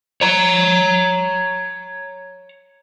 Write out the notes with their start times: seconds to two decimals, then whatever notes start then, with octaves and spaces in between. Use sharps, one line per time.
0.21 C#5 A#5